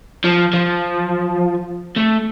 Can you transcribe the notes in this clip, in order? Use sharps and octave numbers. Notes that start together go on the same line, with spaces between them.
F3
F3
A3